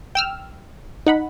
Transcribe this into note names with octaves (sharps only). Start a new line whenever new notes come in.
G5 E6 F6
D#4 F#5 B5